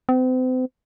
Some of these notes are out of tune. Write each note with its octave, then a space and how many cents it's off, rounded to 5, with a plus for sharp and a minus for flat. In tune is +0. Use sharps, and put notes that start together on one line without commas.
C4 -40